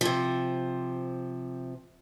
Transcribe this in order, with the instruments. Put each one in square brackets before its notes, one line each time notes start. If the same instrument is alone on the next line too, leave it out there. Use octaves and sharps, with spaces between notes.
[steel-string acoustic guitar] C3 F3